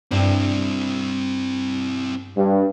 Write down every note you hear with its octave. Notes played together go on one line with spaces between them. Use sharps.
G2 C4 E4
G2